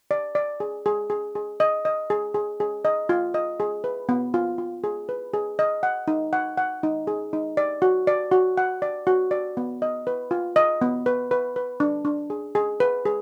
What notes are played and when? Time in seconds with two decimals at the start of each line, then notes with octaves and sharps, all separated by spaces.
0.11 D5
0.35 D5
0.60 G#4
0.86 G#4
1.10 G#4
1.35 G#4
1.60 D#5
1.85 D#5
2.10 G#4
2.35 G#4
2.60 G#4
2.85 D#5
3.09 F4
3.34 D#5
3.60 G#4
3.84 B4
4.09 B3
4.34 F4
4.58 F4
4.84 G#4
5.09 B4
5.34 G#4
5.59 D#5
5.83 F#5
6.08 D#4
6.33 F#5
6.58 F#5
6.83 D#4
7.07 G#4
7.33 D#4
7.57 D5
7.82 F#4
8.07 D5
8.32 F#4
8.58 F#5
8.82 D5
9.07 F#4
9.31 D5
9.57 B3
9.82 D#5
10.07 B4
10.31 F4
10.56 D#5
10.81 B3
11.06 B4
11.31 B4
11.56 B4
11.80 D4
12.05 D4
12.30 G#4
12.55 G#4
12.80 B4
13.05 G#4